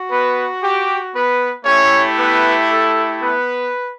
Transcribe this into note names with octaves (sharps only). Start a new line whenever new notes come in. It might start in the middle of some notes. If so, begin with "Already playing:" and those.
Already playing: F#4
B3 B4
G4
B3 B4
A3 C#4 E4 G4 C#5
B3 B4
A4
B3 B4